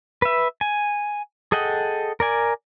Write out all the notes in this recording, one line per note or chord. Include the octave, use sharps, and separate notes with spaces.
B4 E5
G#5
G#4 A4 D#5 F#5 G5
A#4 D5 G#5